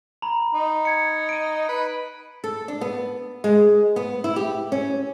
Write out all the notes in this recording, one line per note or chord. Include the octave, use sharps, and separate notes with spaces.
A#5 B5
D#4
G#6 C#7
D7 D#7
B4
A4
D4
B3
G#3
B3
E4
G4
C#4